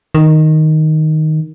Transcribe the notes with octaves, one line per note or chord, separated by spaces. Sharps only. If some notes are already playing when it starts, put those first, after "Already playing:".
D#3